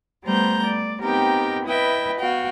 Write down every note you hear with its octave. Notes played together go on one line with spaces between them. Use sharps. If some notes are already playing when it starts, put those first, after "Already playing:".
G3 A3 B3 C5 A#5 G6
D5
B3 C4 D#4 G4 A#4 G5
E4 B4 D#5 E5 G5
B3 F#4 F5 G5